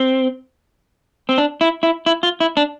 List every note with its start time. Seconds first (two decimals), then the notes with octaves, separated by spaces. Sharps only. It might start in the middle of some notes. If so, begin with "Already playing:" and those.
Already playing: C4
1.29 C4
1.38 D4
1.61 E4
1.83 E4
2.06 E4
2.23 F4
2.40 E4
2.57 D4